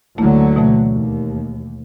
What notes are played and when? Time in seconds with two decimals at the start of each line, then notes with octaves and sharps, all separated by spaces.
0.18 D2 D3 F#3 A3 A#3 E4
0.56 B2 E3 A3
0.92 D#2